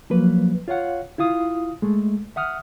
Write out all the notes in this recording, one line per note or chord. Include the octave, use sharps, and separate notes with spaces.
F3 F#3 A#3 B4
F4 C#5 F5 F#5
E4 F4 F5 D#6
G#3 A3
E5 F#5 D#6 F6